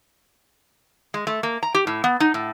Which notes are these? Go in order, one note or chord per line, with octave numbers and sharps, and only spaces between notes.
G#3
A3
A#3
A#5
G4
A2
B3
D#4
A2